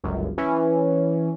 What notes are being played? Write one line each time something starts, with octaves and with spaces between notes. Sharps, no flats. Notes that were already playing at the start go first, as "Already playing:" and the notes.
G1 C#2 F#2
E3 C#4